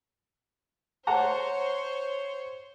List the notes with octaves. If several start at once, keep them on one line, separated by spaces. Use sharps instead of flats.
C5 C#5 F#5 A5 A#5